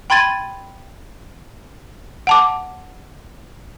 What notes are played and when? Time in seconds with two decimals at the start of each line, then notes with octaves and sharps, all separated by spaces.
0.10 G5 B5 C6 G#6 A6 D#7
2.27 F#5 A5 D6